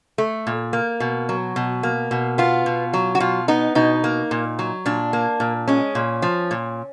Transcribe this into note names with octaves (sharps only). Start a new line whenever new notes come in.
A3
A#2
A#3
B2
F#3
B2
A#3
B2
B3 F4
B2
F#3
F#4
B2 F4
B3 D#4
B2 D#4
A#3
A#2
F#3
A#2 D4
A#3
A#2
G#3 C#4
A#2
F3
A#2